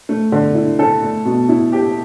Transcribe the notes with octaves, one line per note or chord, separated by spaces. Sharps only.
A3
D3
E4
A4
A3
B2
E4
G4